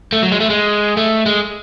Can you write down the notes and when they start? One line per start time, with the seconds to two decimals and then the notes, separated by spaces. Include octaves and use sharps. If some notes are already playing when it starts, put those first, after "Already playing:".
0.13 A3
0.23 F#3
0.32 G#3
0.40 A3
0.50 G#3
0.97 A3
1.26 G#3